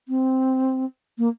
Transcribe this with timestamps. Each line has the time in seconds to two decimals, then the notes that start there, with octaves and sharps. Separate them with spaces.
0.08 C4
1.18 A#3